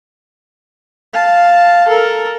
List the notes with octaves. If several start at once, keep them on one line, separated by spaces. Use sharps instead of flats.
F5 A5
A4 A#4